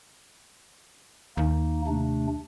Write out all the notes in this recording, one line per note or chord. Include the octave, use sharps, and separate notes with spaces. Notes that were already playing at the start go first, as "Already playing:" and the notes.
D#2 A#3 D#4
C3 A3 D4